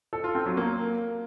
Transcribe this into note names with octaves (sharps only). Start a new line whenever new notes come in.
A4
F4
C4
F#3
A#3